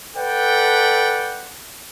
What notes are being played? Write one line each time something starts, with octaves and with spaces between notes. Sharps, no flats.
A4 B4 D5 F#5 G5